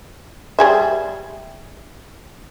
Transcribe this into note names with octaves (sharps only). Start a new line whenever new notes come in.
G3 G#4 E5